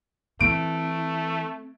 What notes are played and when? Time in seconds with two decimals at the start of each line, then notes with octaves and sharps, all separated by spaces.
0.41 E3 A3 C4 D7